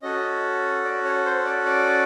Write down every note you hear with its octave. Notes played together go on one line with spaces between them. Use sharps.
C#4 F#4 A4 D#5
D5
C#5
C5
D5
D5